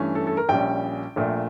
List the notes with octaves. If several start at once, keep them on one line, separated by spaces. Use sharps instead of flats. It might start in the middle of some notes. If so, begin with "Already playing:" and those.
Already playing: G2 E3 A3 C#4
A4
A4
A#4
A#1 A#2 G3 C#4 G5
A#1 A#2 A3